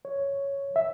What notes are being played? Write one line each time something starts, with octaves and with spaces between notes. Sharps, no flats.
C#5
E5